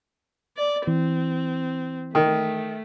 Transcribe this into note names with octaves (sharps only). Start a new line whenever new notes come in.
D5
E3 C4
D#3 A3